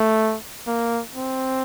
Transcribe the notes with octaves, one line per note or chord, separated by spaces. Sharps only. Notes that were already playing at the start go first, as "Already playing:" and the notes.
Already playing: A3
A#3
C4